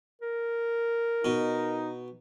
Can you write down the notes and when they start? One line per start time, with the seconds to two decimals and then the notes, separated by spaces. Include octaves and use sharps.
0.22 A#4
1.25 B2 D#4